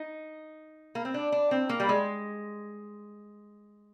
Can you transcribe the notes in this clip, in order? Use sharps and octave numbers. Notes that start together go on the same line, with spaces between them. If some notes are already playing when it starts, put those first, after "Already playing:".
Already playing: D#4
A#3
C4
D4
D4
C4
A#3
G3
G#3